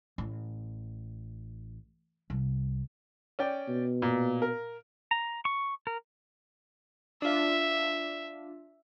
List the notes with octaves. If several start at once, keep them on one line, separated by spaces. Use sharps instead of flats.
A1
C2
C#4 D5 G5
B2
A#2
A#4
A#5
C#6
A#4
D4 F4 E5